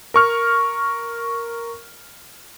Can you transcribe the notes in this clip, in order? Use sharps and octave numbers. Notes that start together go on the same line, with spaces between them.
A#4 C#6 F6